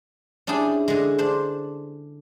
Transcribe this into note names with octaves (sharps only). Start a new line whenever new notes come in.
C#4 D4 E4 G#4 G5
D3 G#3
D4 C5